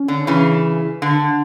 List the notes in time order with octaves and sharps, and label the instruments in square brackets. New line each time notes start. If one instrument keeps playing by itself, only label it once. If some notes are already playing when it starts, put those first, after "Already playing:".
Already playing: [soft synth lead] C#4
[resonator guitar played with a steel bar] D3
C#3 E3
D3